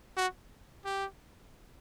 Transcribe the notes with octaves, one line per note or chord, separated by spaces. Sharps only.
F#4
G4